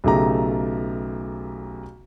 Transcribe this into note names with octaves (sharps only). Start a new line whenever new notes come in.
B1 C#3 A3 G4 A#5